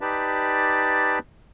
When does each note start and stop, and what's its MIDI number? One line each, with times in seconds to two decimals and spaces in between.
0.01 1.19 63
0.01 1.19 67
0.01 1.19 71
0.01 1.19 74
0.01 1.19 81